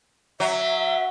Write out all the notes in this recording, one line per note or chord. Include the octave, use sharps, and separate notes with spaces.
F#3 E5